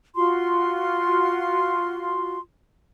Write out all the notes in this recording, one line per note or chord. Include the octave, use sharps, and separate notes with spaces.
F4 F#4 C6